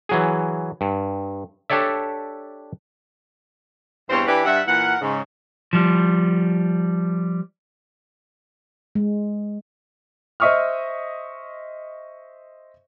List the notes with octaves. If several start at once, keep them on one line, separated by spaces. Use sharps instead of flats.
E3 F#3 G#4
G2
D4 G4 A4 C#5 D5 E5
E2 G2 B3 C4 C5 C#5
E3 D4 E4 G4 B4
G2 E5 F#5
A#2 E3 A#4 F#5
G#2 C#3
F3 G3
G#3
C5 D#5 E5 C#6 D#6 F6